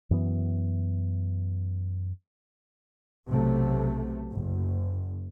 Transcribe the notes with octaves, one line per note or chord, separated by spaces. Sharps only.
F#2 E3 B3
B1 C3 F#3 A3
F#1